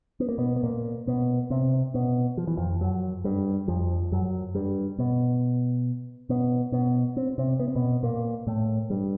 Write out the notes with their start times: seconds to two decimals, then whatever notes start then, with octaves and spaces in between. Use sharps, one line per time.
0.20 B3
0.29 A#3
0.38 B2 B3
0.56 B3
0.63 A#2 A#3
1.07 B2 B3
1.50 C3 C4
1.94 B2 B3
2.37 F3
2.47 E3
2.57 F2 F3
2.81 F#2 F#3
3.24 G2 G3
3.68 F2 F3
4.12 F#2 F#3
4.55 G2 G3
4.99 B2 B3
6.29 B2 B3
6.72 B2 B3
7.17 C4
7.38 C3 C4
7.59 B3
7.68 C4
7.76 B2 B3
8.03 A#2 A#3
8.47 A2 A3
8.90 G2 G3